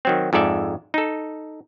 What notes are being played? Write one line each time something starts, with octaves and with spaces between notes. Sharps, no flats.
D#3 F#3 C4
F2 G#2 A4 D5 E5
D#4 A4